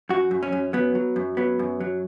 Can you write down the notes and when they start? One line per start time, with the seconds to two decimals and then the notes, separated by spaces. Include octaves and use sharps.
0.09 F#2 F#4
0.31 F#2
0.43 C#4
0.52 F#2
0.73 F#3 B3
0.95 F#3
1.16 F#2
1.37 F#3 B3
1.59 F#2
1.81 F#3